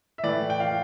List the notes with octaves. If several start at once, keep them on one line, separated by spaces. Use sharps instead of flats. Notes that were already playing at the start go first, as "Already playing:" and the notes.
E5
A2 E3 D5
G5
F5